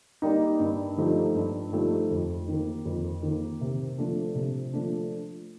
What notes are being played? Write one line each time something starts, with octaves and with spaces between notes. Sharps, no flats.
G3 A#3 D#4
G2
F3 A3 D#4 G4
G2
F3 A3 D#4 G4
F2
D#3 A#3
F2
D#3 A#3
C3
F3 A3 D4
C3
F3 A3 D4